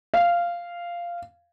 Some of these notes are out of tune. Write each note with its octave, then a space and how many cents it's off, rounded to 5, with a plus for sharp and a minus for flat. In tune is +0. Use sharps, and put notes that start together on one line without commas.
F5 -10